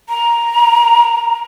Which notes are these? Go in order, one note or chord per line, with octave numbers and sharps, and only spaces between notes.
A#5